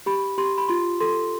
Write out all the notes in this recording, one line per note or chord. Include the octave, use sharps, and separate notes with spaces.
G4 B5
G4 C6
B5
F4 C6
A4 C6